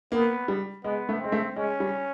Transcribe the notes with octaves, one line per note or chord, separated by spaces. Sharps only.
A#3 B3
G3
G#3 B3
A3
G#3 C4
A3
G#3 C#4
G3